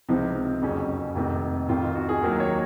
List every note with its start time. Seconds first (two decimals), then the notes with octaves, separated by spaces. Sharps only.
0.09 C#2 C3 F3 C4 D#4
0.62 F#1 F2 C#3 F#3 C#4
1.15 F1 F2 C3 D#3
1.69 F1 F2 C3 D#3 F4
1.82 F4
1.95 F#4
2.09 G#4
2.22 D#2 D#3 F#3 A#3 A#4
2.40 C#5